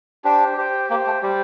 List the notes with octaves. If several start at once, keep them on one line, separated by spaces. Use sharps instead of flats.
D4 G4 C5 G5
G4 C5 G5
A#3 G4 C5 G5
A3
G3 G4 C5 G5